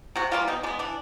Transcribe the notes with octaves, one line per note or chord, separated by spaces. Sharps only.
C3 F#4
E3 G3 A#3 F4
B2 D#4
G#3 B3 D4
E3 D4